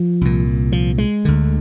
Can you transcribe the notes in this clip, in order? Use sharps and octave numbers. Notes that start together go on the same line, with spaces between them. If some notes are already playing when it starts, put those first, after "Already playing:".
Already playing: F3
C2 A#2
F3
G#3
D2 D3